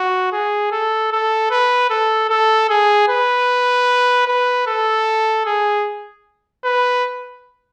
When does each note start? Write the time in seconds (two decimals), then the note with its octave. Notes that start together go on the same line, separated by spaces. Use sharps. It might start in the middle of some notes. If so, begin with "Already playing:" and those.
Already playing: F#4
0.33 G#4
0.72 A4
1.12 A4
1.51 B4
1.90 A4
2.30 A4
2.70 G#4
3.09 B4
4.28 B4
4.67 A4
5.46 G#4
6.64 B4